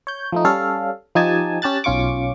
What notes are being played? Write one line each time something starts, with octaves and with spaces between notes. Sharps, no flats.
C#5 G6
F3 A3 D#4
G3 C#4 A4 F5
F3 D#4 G4 G#5 A5
C#4 G4 A5 F#6 A6
B1 C#4 F4 C#6 D6